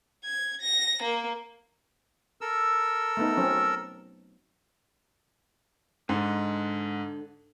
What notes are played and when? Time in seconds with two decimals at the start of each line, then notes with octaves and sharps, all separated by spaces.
0.25 G#6
0.61 A#6
1.03 A#3
2.41 A4 A#4 E6
3.17 A3 B3 D#4
3.37 F#3 C4 C#4
6.09 G#2 D3